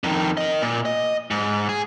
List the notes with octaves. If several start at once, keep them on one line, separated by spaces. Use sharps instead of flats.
F2 D#3
A#4 D#5
A#2
D#5
G#2
G#4